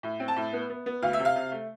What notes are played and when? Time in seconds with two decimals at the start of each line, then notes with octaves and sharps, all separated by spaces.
0.03 A2
0.20 C4
0.28 A5
0.36 A2
0.53 B3
0.70 B3
0.86 B3
1.02 D2 F5
1.13 E5
1.19 C3
1.25 F5
1.36 C3
1.52 A3